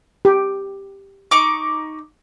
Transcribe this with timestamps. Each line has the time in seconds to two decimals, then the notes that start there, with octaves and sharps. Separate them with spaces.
0.25 G4
1.31 D#4 C#6 D6